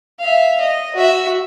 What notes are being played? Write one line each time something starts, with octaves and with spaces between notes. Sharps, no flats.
E5 F5
D#5
F#4 E5